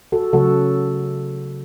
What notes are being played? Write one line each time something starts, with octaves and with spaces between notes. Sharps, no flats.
F#4 A4
C#3 F#3 A3 F#4 A4